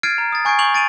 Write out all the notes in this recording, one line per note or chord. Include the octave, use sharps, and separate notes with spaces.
F6 G#6 A6 C7 D7 D#7
A#5
D#6 A6
G#5 C#6 G6 G#6 C7 D7
C#6 D6 G6 C7 F7 F#7
A6 D7 D#7 F7